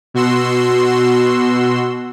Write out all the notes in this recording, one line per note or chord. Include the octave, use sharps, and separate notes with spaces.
B2 F#4 C6 E6